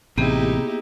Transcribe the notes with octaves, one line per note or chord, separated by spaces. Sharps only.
A1 C3 A#3 B3 D#4 E4 G4 G#4